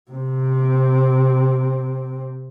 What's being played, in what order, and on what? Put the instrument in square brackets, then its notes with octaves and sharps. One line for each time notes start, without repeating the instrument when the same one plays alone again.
[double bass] C3 C4